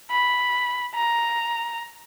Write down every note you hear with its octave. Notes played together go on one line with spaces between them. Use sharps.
B5
A#5